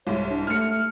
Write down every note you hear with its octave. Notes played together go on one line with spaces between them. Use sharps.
C2 G#2 C#5
D4
A3 F6 C#7